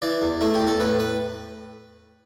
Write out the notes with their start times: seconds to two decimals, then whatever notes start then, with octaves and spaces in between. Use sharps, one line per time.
0.02 E3 D5
0.22 E2
0.41 A3 E4
0.54 G4
0.61 E2
0.67 A4
0.80 A2 B4
0.99 B4